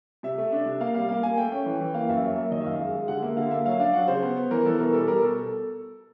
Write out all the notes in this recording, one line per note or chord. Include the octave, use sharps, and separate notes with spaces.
C3 E5
A3
D4
C3
A#3 F5
G3 F5
A#3 F5
A#3 G#5
A3 G5
C#4 G5
E3
E3
A#3 F5
F#2 E5
F#3
A#3
D#3 D#5
E5
F#2 F5
G#3
G#3
D3 F#5
A#3 E5
D3 F5
A#3 E5
F#3 F5
D4 F5
F#3 F#5
C#3 C5
B3
B3
E3 A#4
E3 A4
B2 A#4
G3 A4
G3 A#4
B2 A4